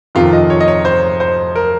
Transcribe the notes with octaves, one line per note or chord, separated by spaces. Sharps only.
F2 C3 D#3 F4
D#5
C#5
D#5
C#5
C5
C5
A#4